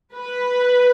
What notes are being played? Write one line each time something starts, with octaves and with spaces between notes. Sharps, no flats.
B4